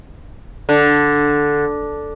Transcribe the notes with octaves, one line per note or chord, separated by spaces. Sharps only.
D3